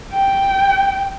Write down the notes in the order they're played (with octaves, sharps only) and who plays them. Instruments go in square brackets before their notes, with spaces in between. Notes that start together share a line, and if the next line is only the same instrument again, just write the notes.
[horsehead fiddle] G5